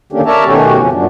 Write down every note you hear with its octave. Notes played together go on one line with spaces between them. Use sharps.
D3 D#3 A#3 C#4 D4 G4
A#4 C#5 D5 E5 A5 A#5
B2 D#3 A3 C#4 F#4 G4
F2 C#3 F3 C#4
F#2 A#2 F#3 D4